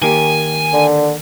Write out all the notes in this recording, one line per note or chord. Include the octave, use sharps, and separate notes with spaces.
D#3 A#3 G4 G#5
D3